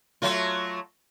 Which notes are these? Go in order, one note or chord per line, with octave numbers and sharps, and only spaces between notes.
F#3 A3 F4